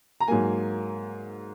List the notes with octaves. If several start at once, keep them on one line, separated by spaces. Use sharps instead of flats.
A#5
G#2 F#3 A#3 G#5